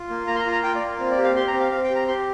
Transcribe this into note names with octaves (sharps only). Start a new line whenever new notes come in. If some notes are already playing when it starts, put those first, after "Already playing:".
Already playing: F4
A#3
A#3 A#5
C6
A#5
F4
A#5
F4 G5
D5
A#3
C4
D5
G4
F5
G4 C6
A#5
C4
F5
C4 F5
G5
G4
A#5
G4 C6